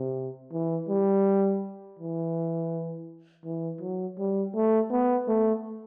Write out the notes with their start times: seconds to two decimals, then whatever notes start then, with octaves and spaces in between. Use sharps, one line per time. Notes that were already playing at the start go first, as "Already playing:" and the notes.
Already playing: C3
0.53 E3
0.89 G3
1.99 E3
3.45 E3
3.81 F#3
4.19 G3
4.55 A3
4.91 B3
5.28 A3